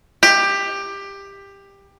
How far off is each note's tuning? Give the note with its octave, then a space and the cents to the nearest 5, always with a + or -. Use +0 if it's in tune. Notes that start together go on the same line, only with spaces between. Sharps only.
G4 +15